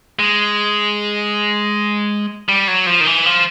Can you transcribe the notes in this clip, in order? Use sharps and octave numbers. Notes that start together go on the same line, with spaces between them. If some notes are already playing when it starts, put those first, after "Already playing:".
G#3
G3
F#3
F3
D#3
E3
F3